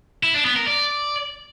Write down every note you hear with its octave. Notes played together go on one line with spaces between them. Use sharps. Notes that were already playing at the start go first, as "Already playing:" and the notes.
E4
D4
B3
A#4
D5